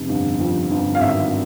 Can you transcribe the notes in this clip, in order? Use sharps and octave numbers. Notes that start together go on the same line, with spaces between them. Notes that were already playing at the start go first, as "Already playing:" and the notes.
Already playing: F1
G1
F2
G1
F5
G#1 E5